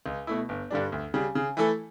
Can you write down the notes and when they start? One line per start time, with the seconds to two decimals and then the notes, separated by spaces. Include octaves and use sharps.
0.06 C#2
0.27 B2 A3 E4
0.49 G1
0.71 G2 D3 G3 D4
0.92 D2
1.14 C#3 G3
1.35 C#3
1.57 E3 A3 E4 A4